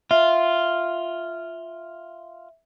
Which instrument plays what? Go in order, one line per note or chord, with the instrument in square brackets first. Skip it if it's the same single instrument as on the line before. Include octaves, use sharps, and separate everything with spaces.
[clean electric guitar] F4 [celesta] E5